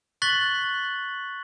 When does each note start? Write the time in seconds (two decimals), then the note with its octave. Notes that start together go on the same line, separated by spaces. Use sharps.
0.22 C#6 F#6 A6 B6 F#7 G7